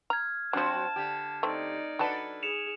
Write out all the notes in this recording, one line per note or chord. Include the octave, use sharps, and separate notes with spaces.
A#5 F6 G#6
F3 F#3 C4 D4 F#4 A5
D3 G4
A3 C4 D#4 D5
F#3 D4 A4 B4 A5
G#4 C#7 E7 F7